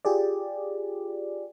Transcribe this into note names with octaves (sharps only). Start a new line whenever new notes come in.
F4 G4 G#4 D5